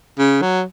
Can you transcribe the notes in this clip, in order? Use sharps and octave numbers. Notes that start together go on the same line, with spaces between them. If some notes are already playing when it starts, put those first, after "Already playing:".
C#3
F#3